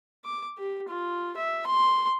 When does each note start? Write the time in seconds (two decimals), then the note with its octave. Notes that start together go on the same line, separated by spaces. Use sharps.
0.25 D6
0.58 G4
0.88 F4
1.36 E5
1.66 C6